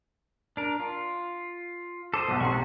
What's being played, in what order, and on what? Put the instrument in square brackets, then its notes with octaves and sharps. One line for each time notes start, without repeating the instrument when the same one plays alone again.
[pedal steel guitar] D4 A#4
F4
[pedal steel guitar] A4 C5 D#6 [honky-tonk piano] D6
[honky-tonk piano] B1 B2
[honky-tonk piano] B1 C3 C6 [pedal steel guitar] F#4 C#6